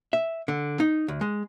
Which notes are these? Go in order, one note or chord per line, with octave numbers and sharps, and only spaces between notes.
E5
D3
D#4
D2
G#3